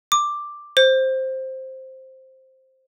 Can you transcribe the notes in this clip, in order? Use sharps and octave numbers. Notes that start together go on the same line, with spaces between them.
D6
C5